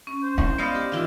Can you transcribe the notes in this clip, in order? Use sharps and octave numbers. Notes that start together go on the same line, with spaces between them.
C#4
C5
E4
B3 D5 D#5 F5
G4
D#3 E3 F4 F5